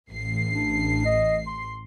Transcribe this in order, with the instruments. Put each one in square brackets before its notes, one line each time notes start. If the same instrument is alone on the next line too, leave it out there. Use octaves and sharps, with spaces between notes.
[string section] A1 C7
[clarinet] D4
D#5
C6